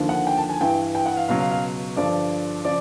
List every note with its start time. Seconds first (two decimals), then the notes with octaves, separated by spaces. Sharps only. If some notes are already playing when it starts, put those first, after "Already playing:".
Already playing: D#2 D3 F3
0.09 F#5
0.27 G5
0.37 A5
0.50 G#5
0.61 G2 E3 G5
0.95 G5
1.06 F#5
1.17 F5
1.28 C#2 B2 F#3 F5
1.40 F5
1.51 F5
1.97 G2 D3 F3 D5
2.65 C#3 F3 D5